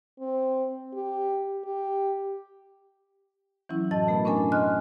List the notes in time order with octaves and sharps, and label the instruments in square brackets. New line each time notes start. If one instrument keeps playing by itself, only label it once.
[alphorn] C4
G4
G4
[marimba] E3 F#3 C#4 E4
F#2 A2 E4 D#5 A5 A6
B2 A3 B3 A#4
C#4 D4 A#4 G#5
D#5 G#5 C6 F6 F#6